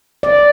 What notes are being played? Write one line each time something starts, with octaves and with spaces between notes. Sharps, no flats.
D5